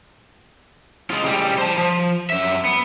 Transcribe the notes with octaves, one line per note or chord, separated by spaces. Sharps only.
G#3 F4
C#3 G3
C5 A5
F3
F#2 E5
B3